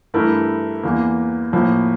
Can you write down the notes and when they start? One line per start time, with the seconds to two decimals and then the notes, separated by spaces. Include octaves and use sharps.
0.14 G2 E3 A3 E4 A#4
0.83 E2 E3 A#3
1.53 A2 F3 A#3